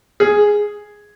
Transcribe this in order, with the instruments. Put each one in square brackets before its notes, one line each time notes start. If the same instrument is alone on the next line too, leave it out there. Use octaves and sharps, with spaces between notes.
[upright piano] G#4